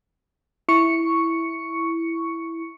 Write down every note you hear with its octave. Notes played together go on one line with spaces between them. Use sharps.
E4 C#6 C#7